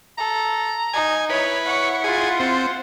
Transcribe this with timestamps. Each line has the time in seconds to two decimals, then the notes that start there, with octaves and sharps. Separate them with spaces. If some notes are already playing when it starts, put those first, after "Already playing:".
0.18 A4 A#5
0.93 D#4 G#5
1.30 E4 B4 C#5
1.66 C#5 F#5
2.04 F4 G#4
2.40 C4